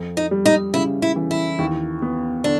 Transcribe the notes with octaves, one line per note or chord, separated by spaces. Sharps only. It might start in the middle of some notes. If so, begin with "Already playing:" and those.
Already playing: F2
D#4
G3
D#4
C#3 E4
E4
E3
E4
D#2
B3
D3 D4